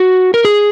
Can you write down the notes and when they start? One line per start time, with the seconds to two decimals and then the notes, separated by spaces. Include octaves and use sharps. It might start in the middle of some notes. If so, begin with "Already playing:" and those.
Already playing: F#4
0.34 A#4
0.45 G#4